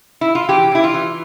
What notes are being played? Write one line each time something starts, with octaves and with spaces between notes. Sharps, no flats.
E4
F4
E3 G4
E3 E4
F4
E3